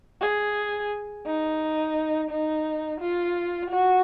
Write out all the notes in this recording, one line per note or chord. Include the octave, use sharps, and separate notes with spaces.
G#4
D#4
D#4
F4
F#4